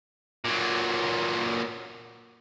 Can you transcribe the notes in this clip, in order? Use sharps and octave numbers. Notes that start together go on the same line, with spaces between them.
A#2 F#3